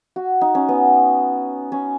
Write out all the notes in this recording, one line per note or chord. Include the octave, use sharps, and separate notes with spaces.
F#4
D#4
C#4
B3
C#4